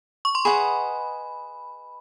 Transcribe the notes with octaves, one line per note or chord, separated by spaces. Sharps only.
C#6
C6
G#4 B4 D#5 F#5 B5